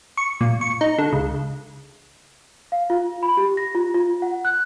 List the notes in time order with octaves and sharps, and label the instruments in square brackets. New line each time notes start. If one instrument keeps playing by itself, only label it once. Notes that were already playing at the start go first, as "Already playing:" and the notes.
[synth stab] C#6
A#2
C#6
D#4
D3
C#2
[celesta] F5
F4
B5
G4
A#6
F4
F4
F#5
F#6